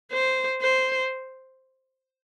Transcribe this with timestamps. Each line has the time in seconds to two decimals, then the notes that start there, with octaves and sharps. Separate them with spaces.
0.12 C5
0.61 C5